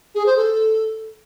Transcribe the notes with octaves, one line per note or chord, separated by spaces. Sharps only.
G#4
C5
A4